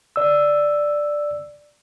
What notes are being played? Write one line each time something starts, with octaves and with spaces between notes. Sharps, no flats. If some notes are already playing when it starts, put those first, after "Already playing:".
D5 E6